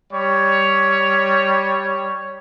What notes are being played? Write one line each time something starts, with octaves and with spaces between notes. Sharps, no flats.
G3 C#5